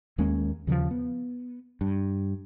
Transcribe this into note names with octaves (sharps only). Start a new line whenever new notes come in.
D#2 G#3 A#3 C#4
D#2 C#3 E3 F3
B3
G2